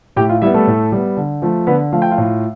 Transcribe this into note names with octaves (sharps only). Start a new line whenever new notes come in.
A2 G4 G5
F4 F5
G3 B3 E4 E5
A3 A4
A2
G3 B3
D3
F3 A3
D3 B3 B4
F3 A3 F5
G5
F4 F5
A2